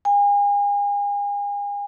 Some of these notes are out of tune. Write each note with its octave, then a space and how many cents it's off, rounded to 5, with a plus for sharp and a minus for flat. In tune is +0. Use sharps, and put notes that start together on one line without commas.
G#5 -40